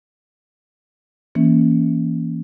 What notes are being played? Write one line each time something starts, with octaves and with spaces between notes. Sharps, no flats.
E3 A#3 C#4